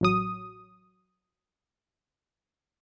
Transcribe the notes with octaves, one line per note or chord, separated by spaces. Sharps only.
A1 F#3 D#6